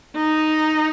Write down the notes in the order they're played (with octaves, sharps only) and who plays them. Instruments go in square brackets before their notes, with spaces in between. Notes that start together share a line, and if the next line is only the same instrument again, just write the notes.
[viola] D#4